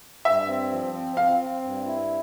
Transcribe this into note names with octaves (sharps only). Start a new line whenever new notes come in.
G2 E5
C4
F3
C4
C4 F5
C4
G2
E4